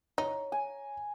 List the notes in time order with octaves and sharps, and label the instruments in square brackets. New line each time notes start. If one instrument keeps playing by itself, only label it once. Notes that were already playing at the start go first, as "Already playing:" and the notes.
[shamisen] D#4 [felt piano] C#5 A#5
[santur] G#5